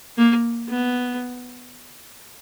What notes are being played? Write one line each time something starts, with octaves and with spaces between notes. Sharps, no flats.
A#3
B3